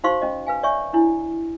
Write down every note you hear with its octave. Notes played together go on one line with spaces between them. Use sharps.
D#4 F#4 C5 F5 C6 C#6
C#4 D#5
B4 F5 G#5
C#5 D5 E5 G#5 C#6
D4 E4